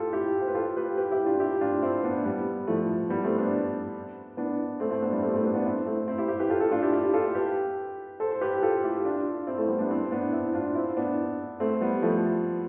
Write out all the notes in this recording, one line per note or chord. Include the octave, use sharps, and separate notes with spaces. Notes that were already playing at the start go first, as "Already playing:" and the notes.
Already playing: F4 G4 A4
E4 G4
C5
B4
F4 A4
G4 B4
G4 B4
E4 G4
D4 F4
E4 G4
D4 F4
C4 E4
B3 D4
G3 B3
F3 A3
G3 B3
A3 C4
B3 D4
B3 D4
A3 C4
A3 C4
B3 D4
G3 B3
A3 C4
A3 C4
B3 D4
B3 D4
C4 E4
A3 C4
C4 E4
E4 G4
E4 G4
G4 B4
F4 A4
F4 A4
D4 F4
E4 G4
E4 G4
F4 A4
G4 B4
A4 C5
C5
G4 B4
F4 A4
E4 G4
D4 F4
C4 E4
A3 C4
G3 B3
B3 D4
C4 E4
B3 D4
C4 E4
D4 F4
C4 E4
B3 D4
A3 C4
G3 B3
F3 A3